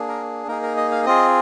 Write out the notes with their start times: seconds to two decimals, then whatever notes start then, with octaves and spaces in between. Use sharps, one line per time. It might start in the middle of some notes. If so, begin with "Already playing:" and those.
Already playing: A#3 D4 G#4
0.08 A#4
0.47 A#3 D#4 G#4 A#4
0.63 A#4
0.77 D#5
0.91 F5
1.06 C4 F4 G#4 D#5